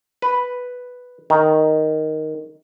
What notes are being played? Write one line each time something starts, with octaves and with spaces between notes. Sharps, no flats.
B4
D#3